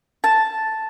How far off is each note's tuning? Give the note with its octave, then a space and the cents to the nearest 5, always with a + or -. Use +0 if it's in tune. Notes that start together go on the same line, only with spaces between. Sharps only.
A5 +0